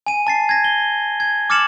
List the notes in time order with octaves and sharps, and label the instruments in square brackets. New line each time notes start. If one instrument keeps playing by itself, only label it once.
[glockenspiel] G#5 D#7
A5 A6 C7
G#6 A#6
G7
G#6
D6 F6 A6 C#7 E7 F#7